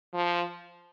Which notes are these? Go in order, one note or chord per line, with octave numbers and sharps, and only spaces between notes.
F3